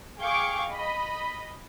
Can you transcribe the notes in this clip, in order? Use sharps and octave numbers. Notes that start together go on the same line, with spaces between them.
G#4 F5 G5 C#6 D6
D#5 B5